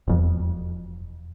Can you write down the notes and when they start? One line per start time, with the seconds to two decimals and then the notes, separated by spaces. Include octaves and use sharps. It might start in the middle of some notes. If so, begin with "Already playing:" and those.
0.08 E1 F2